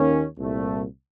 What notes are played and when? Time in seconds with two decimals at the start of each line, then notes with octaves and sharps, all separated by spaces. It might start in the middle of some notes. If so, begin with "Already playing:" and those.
Already playing: D#2 D#3 A#3 C#4
0.38 C2 A#2 A3